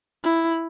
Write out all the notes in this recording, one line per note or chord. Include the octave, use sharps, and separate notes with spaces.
E4